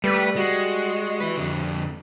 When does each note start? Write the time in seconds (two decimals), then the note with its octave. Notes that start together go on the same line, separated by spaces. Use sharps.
0.04 G3 A3 B4
0.36 G#3 F#4
1.20 E4 B4
1.37 F2 D3